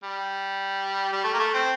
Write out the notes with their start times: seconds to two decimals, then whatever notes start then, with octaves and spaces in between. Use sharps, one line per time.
0.04 G3
1.13 G3
1.24 A3
1.34 A#3
1.39 A3
1.54 C4